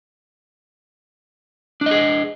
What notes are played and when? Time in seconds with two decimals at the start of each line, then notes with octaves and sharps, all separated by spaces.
1.81 D4
1.86 D#5
1.91 G#4